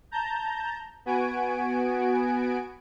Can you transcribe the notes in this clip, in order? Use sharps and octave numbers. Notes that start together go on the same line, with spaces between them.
A5 A#5 G6
B3 F#4 G#5 D7